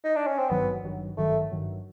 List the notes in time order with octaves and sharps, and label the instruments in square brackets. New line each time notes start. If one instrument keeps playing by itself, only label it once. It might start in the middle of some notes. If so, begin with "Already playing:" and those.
[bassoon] D#4
D4
C#4
C4
[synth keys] G#1 G2 D#3 F#3 [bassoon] B3
[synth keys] G#1 G2 D#3 F#3
[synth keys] G#1 G2 D#3 F#3 [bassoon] A3
[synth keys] G#1 G2 D#3 F#3